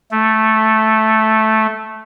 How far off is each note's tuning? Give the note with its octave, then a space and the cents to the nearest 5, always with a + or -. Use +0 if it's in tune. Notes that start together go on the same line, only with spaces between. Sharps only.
A3 -5